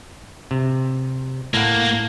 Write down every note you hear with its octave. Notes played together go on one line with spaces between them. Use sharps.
C3
A2 A#3 F#5